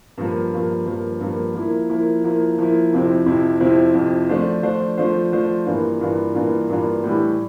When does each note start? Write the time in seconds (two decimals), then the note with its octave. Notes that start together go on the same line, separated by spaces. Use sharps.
0.18 G2 F3 A#3
0.52 G2 F3 A#3
0.86 G2 F3 A#3
1.21 G2 F3 A#3
1.55 F3 A#3 E4
1.90 F3 A#3 E4
2.24 F3 A#3 E4
2.58 F3 A#3 E4
2.92 F2 C3 F3 C4 E4
3.26 F2 C3 F3 C4 E4
3.60 F2 C3 F3 C4 E4
3.94 F2 C3 F3 C4 E4
4.29 F3 A3 D4 F4 C5
4.63 F3 A3 D4 F4 C5
4.97 F3 A3 D4 F4 C5
5.32 F3 A3 D4 F4 C5
5.66 G2 E3 A#3 D4 F4
6.01 G2 E3 A#3 D4 F4
6.35 G2 E3 A#3 D4 F4
6.69 G2 E3 A#3 D4 F4
7.04 A2 E3 G3